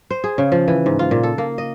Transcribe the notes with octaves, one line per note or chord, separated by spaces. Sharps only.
C5
G#4
C#3
F3
E3
G#2
F4
A#2
A4
A#3
D#5